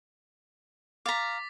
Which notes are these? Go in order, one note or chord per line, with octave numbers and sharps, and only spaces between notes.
F5 A#5 D6 A6 B6